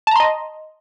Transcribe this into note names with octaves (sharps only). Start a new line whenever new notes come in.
D#5 A5 A#5 C6